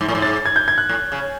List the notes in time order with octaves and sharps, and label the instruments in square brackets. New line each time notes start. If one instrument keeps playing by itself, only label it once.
[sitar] G#2
A2
G#2
[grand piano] A6
G#6
G6
G#6
F#6
[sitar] A2
C#3